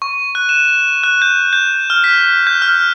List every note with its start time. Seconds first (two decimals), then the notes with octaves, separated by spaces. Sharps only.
0.02 C#6
0.35 F#6
0.49 E7
0.65 E7
1.04 F#6
1.22 G6
1.53 G6
1.90 F6
2.04 B6
2.47 G6
2.62 F6